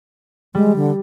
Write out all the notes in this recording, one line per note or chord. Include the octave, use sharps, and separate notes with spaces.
G3 G#3
D3